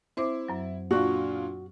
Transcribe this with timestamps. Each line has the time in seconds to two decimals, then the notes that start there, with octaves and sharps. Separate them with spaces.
0.17 C4 E4 C5 D6
0.48 F#2 F#3
0.91 A#2 D4 F4 F#4